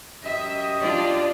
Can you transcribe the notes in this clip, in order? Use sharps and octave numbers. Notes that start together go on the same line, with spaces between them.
F#2 G4 D#5 E5
D4 F4 D5